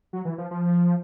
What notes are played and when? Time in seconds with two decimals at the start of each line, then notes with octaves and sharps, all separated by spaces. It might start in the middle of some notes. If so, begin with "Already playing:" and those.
0.13 F#3
0.25 E3
0.38 F3
0.51 F3